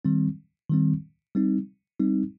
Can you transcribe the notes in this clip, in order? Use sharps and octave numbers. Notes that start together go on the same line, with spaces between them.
D#3 G3 C4
D#3 G3 C4
G3 C4 D#4
G3 C4 D#4